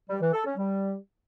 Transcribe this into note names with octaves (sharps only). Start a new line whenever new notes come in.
G3
E3
A4
C#4
G3